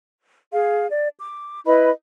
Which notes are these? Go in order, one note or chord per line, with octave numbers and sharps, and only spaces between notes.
G#4 F5
D5
D6
E4 B4 D#5 B5